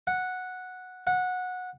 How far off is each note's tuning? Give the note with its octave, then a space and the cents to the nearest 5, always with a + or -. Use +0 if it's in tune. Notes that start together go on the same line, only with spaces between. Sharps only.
F#5 -5
F#5 -15